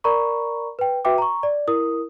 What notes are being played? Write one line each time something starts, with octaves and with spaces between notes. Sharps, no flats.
A#4 D5 A#5 B5 C#6
B4 G5
F#4 B4 E5 G5 D6
A#5 C#6
D5
E4 A#4 D#6